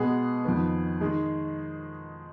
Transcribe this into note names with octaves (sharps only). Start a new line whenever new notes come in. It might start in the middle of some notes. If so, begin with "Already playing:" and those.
Already playing: B2 G#3 B3 G#4
F2 D#3 B3
D#3 G#3